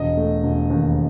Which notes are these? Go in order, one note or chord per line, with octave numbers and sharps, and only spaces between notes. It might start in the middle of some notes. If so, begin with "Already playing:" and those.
Already playing: E1 D#5
A3
E1
D#2